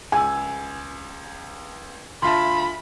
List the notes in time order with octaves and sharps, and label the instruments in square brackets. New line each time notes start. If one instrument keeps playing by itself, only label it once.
[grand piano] C#2 [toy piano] G#4 E6 [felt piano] G#5
[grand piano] D2 F4 A5 [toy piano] E5 C6 [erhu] B5